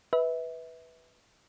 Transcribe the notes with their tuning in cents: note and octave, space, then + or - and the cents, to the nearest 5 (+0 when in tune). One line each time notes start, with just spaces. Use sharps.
B4 +0 E5 -30